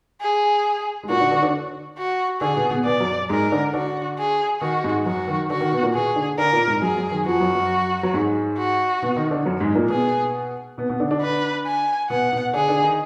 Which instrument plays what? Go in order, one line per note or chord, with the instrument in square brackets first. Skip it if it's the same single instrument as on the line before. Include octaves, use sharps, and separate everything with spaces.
[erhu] G#4
[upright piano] G#3
[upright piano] A#2 A#3 [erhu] F#4
[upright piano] D3 D4
D3 D4
D3 D4
[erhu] F#4
[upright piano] D3 D4 [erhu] G#4
[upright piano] B2 B3
B2 B3
[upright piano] B2 B3 [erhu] D5
[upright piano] F#2 F#3
[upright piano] G#2 G#3 [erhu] A#4
[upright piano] D3 D4
[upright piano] D3 D4 [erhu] F#4
[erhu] G#4
[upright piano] D#3 D#4 [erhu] F#4
[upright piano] G#2 G#3
[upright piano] F#2 F#3 [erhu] F#4
[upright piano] D#3
[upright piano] D3 [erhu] F#4
[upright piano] D#3
B2 B3
A#2 A#3
[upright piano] B2 B3 [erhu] G#4
[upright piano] D3 D4
[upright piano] D3 D4 [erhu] A#4
[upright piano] A#2 A#3
G#2 G#3
[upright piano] F#2 F#3 [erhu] G#4
[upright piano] F#2 F#3
D#3
[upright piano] F2 F3 [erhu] F#4
[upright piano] F#2 F#3
F#2 F#3
F#3
G#2 G#3
[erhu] F#4
[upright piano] B2 B3
D#3 D#4
D3 D4
F#2 F#3
G#2 G#3
A#2 A#3
[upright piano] B2 B3 [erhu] G#4
[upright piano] B2 B3
B2 B3
D3 D4
D3 D4
[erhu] B4
G#5
[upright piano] B2 B3 [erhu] F#5
[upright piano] B2 B3
[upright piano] D3 D4 [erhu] G#4
[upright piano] D3 D4
D#3 D#4